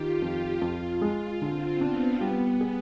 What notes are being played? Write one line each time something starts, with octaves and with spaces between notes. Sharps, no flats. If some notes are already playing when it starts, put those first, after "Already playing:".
Already playing: D#3 F4 G4
F2
F2
G#3
D3 C4
B3 D4
G3 B3
G#4